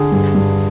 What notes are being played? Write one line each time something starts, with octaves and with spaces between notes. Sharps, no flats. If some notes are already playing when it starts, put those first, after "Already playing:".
Already playing: D3 G#4
G2
G2